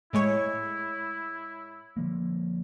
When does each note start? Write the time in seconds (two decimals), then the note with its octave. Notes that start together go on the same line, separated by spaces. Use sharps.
0.13 A2 G#3 E4 C#5
1.97 D3 F3 A#3